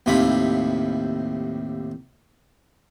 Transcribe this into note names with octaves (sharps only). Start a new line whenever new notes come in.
D#2 A2 C3 F4 B5